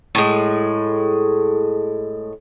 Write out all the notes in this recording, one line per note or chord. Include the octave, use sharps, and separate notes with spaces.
A2 G#3